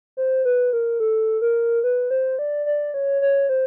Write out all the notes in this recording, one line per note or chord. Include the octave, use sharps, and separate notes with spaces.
C5
B4
A#4
A4
A#4
B4
C5
D5
D5
C#5
C#5
C5